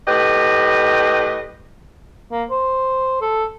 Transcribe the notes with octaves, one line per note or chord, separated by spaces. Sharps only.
A2 G4 B4 D#5
A#3
C5
A4